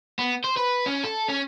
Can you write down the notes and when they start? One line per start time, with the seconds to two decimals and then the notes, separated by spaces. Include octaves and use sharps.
0.19 B3
0.44 C5
0.57 B4
0.86 C#4
1.03 A4
1.28 C#4